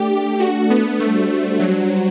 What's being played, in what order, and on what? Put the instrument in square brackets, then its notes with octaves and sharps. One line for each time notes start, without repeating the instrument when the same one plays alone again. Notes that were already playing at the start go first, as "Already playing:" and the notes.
Already playing: [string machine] A3 D4 A4 [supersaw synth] G4
[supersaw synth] F#4
B3
[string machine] G3 D4 F#4 C5 [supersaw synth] A3
[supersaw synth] F#3